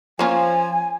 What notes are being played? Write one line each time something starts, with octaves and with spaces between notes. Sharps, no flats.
F3 A#3 C#4 F4 G#5